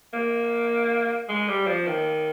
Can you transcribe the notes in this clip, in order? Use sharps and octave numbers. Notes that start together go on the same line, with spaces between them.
A#3
G#3
G3
F3
D#3